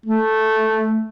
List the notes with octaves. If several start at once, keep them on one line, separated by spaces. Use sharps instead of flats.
A3